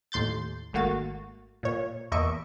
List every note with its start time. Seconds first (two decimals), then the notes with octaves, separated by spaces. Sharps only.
0.12 D#2 A2 C6 G6 A6
0.73 G#1 A3 A#3 F#4 A6
1.63 A#2 C#5
2.12 E2 A#3 D#5 E5 C#6 D7